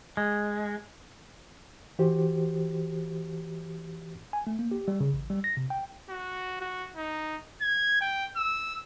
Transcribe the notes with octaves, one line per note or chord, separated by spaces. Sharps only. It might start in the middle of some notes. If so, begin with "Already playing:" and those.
G#3
E3 F#4 G4 C5
G#5
A3
A#3
G4
G3
C#3
A1
G3
A#6
C3
G5
F#4
F#4
D#4
G#6
G5
E6